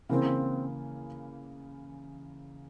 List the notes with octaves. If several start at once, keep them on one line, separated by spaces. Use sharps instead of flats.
C#3 E3 A#3 C4